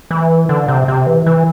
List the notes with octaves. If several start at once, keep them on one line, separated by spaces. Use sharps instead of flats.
E3
D3
C3
C3
E3
E3